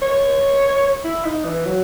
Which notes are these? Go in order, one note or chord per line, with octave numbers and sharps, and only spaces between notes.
C#5
E4
D#4
E3
F#3